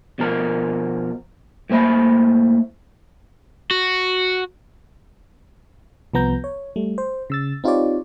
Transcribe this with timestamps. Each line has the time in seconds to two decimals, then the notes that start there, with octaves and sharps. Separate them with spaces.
0.19 B2 F3 A#4
1.70 A2 A#3 C5 E5 B5
3.71 F#4
6.14 C2 F3 B3 A#5 G6
6.44 C#5
6.76 G3 A3
6.98 C5
7.30 C#3 E6 A6
7.64 C4 D#4 F4 G4 C#5 D5